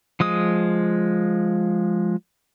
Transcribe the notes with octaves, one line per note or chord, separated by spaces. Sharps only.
F3 G#3 D#6